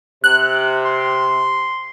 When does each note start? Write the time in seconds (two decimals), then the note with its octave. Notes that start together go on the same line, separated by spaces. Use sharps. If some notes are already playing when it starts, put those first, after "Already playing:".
0.24 C3 F#6
0.85 C6